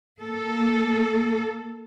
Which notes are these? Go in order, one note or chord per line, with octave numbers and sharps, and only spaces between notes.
A#3 A4